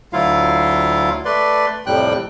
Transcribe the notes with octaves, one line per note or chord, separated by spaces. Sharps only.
D2 F#3 E4 F4 F5
A3 B4 D5 C6
F2 A2 C3 G3 G5 F#6